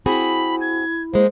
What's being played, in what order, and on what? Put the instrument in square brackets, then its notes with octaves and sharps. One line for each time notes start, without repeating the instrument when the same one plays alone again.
[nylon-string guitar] C4 F#4 G#4 [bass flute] E4 [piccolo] B5
[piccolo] G#6
[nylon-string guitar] G#3 A#3 [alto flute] C5